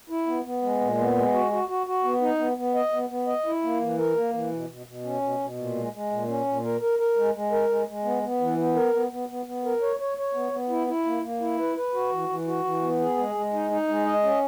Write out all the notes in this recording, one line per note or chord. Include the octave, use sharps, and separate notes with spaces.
E4
B3
B3
G#3
A#2
B3
G#3
F#4
F#4
F#4
F#4
B3
D#4
B3
B3
D#5
B3
B3
D#5
E4
A#3
E3
A#4
A#3
E3
B2
B2
B2
C#4
B2
B2
A#2
G#3
G#3
A#2
C#4
A#2
A#4
A#4
A#4
G#3
G#3
A#4
G#3
G#3
B3
B3
E3
B3
A#4
B3
B3
B3
B3
A#4
C#5
C#5
C#5
B3
B3
E4
E4
A#3
A#3
E4
B4
B4
F#4
E3
E3
F#4
E3
B3
G#4
G#3
G#3
D#4
D#4
G#3
D#5
C#4